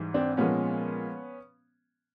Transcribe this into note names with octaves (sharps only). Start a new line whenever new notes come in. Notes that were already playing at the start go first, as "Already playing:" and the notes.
Already playing: G#2 E3 G3
C4 D4
A#2 F3 G#3 B3 C#4